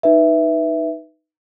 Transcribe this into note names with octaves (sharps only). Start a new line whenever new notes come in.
D#4 B4 E5